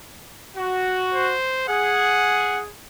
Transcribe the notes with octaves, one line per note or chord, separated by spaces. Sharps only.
F#4
C5
G#4 F#5